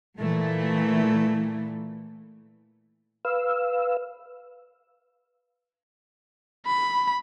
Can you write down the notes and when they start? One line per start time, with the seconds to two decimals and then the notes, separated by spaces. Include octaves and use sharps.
0.19 A#2 E3 A3
3.25 B4 F5 E6
6.67 B5